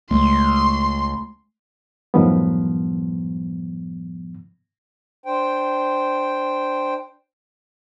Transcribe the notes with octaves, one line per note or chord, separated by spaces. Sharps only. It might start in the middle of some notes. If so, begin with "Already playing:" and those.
C#2 G#3 A3 C6
F#2 A2 D#3 F3 G3 B3
D4 C5 G5